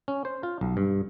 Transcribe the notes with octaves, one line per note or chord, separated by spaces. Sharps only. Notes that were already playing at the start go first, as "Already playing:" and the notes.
C#4
C5
F4
B1
G2